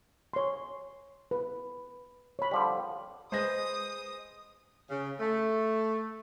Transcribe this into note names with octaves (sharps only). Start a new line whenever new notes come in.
C#5 C6
B4
C#5 B5
D3 F3 G3
G#3 G#4 B4 C5 D#5 D#6 A#6
C#3
A3